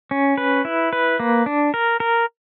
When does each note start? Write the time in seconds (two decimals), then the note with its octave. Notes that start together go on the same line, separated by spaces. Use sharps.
0.11 C#4
0.38 B4
0.65 E4
0.93 B4
1.20 A#3
1.46 D4
1.74 A#4
2.00 A#4